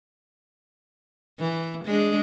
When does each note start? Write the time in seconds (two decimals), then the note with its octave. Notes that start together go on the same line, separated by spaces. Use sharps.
1.39 E3
1.85 G#3 D4